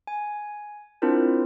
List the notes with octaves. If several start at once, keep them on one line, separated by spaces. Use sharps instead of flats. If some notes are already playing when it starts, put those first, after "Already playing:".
G#5
C4 D4 E4 F4 A#4 C5